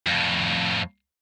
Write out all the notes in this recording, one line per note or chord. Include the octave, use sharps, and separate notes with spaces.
F2 A2